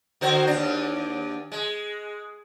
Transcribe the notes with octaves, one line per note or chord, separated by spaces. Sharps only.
D3 F#4 C5
D#2 D4
G#3